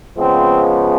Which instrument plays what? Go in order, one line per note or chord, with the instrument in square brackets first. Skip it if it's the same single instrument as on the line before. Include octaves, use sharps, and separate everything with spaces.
[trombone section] C#3 F3 G#3 B3 C4